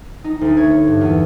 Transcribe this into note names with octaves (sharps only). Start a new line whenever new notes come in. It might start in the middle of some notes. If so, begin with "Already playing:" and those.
D#4
D2
C#5
C#5
G2
E2